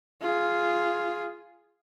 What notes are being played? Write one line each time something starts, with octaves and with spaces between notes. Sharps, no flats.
F4 G#4